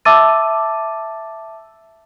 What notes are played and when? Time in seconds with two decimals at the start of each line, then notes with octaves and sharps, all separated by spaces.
0.05 E5 A5 D6 E6 A6 D#7